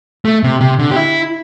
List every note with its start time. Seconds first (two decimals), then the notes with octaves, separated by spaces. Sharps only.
0.25 A3
0.43 C3
0.61 C3
0.79 D3
0.91 G4
0.96 E4